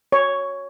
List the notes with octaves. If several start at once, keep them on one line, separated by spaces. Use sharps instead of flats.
C#5